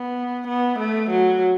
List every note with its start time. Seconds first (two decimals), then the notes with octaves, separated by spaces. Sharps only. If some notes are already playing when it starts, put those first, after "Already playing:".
Already playing: B3
0.48 B3
0.79 A3
1.10 F#3